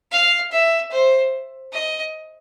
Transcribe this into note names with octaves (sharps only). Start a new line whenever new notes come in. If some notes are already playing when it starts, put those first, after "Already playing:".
F5
E5
C5
D#5